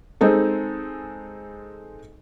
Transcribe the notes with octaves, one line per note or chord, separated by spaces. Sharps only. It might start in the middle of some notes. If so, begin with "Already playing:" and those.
G#3 C4 D#4 A4